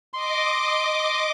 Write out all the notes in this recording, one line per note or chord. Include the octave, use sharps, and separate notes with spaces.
D#5 C6 D6